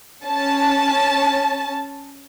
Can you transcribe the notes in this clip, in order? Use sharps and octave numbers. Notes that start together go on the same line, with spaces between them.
C#4 A5